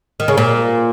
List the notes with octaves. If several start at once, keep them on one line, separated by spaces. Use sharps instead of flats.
D#3
C#3
A#2